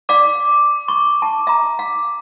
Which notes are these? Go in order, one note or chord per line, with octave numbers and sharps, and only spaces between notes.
D5 F5 D6
C#6
A5
E5 A#5
F5